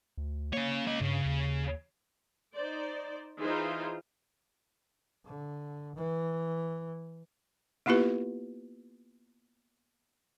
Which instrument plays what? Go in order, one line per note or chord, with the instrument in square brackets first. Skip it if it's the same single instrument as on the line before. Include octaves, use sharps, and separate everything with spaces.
[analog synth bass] D2
[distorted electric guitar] C#3 C#5 [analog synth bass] A#3
[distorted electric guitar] C#4 D#5
[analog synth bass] G2 [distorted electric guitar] C#3
[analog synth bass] D#2
[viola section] D#4 C5 D5
E3 D#4 F4 G#4 C5
[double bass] D3
E3
[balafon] A#3 B3 E4 F4 G4 B4